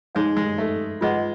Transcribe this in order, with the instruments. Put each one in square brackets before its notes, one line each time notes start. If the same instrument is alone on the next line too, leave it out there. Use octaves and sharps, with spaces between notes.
[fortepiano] G#3 [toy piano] D#4 G#4 C#5 F5
[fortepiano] G#3
A3
[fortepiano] G#3 [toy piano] F4 G#4 B4 D#5 F#5